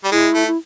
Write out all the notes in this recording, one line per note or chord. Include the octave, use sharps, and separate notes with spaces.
G3
G#3 E4
A3
E4